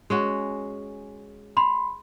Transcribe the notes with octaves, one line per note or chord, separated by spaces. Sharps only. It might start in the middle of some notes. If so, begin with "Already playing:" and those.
G#3 C#4 F#4
B5 C6